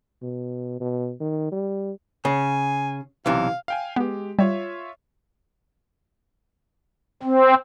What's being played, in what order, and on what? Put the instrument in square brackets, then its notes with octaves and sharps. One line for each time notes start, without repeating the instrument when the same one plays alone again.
[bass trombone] B2
B2
D#3
G3
[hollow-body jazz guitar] C#3 [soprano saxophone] G#5
[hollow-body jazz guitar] B1 C3 E3 [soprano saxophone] F5
[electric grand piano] F5 G5 G#5
[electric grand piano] G#3 G4 [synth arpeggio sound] B3
[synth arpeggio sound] G3 [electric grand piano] F4 C#5 E5
[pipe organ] C4